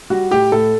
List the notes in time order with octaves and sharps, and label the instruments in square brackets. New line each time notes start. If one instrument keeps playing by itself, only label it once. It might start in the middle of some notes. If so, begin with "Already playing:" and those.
[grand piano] G3 F#4
A2 G4
A2 A4